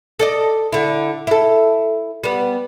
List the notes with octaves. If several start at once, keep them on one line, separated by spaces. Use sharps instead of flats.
A4 D5 D#5
D3 E4
E4 A4
G3 B3